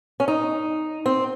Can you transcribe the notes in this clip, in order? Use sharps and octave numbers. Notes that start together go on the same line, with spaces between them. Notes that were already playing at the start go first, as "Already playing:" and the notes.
C#4
D#4
C4